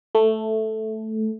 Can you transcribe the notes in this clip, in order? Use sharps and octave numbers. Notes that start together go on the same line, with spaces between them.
A3